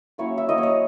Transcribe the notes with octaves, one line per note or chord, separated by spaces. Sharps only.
F#3 A#3 C#4 E4 C#5
E5
F#3 A#3 E4 D#5
C#5
D#5